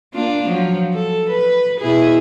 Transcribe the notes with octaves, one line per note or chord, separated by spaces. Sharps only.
A#3 D4 F4
F3 F#3
A4
B4
B2 E4 G#4